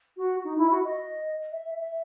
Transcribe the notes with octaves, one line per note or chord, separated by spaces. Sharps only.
F#4
D#4
E4
F#4
D#5
E5
E5